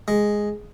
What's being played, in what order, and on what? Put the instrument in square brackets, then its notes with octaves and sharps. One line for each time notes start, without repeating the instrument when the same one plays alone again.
[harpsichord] G#3